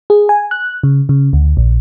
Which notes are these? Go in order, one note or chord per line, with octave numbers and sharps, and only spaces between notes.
G#4
G#5
F#6
C#3
C#3
D2
A#1